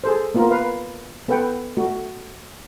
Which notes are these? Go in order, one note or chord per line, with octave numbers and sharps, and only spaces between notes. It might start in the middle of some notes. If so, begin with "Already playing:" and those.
G#4 A4 C5
A#3 B3 F4 A#4
B4 F5
B3 A4 B4 F#5 G5
A3 F#4